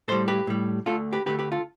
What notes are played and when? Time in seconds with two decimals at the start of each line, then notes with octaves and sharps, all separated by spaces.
0.08 A2 G3 A4 C5
0.28 G4 B4
0.47 A2 G3
0.86 D2 D3 A3 F4 A4
1.13 G4 B4
1.26 D2 D3 A3 G4 B4
1.39 G4 B4
1.52 F4 A4